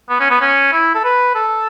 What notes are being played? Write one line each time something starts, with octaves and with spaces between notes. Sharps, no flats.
B3
C#4
B3
C#4
E4
A4
B4
A4